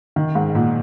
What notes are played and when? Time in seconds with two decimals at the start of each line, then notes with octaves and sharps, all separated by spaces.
0.16 D#3
0.35 G#2
0.55 A#2